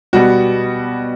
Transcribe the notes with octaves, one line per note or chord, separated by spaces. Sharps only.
B2 G3 B3 F#4